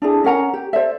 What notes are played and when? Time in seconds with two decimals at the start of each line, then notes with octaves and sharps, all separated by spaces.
0.02 D4 E4 G#4
0.24 C#4 A#4 F#5 A#5
0.54 G4
0.73 C5 D5 E5